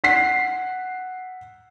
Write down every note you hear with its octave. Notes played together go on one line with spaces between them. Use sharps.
F#5 B6 C7